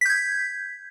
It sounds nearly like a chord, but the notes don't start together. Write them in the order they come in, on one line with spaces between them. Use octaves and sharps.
B6 G6 G#6